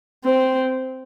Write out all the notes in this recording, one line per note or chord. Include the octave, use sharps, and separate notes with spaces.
C4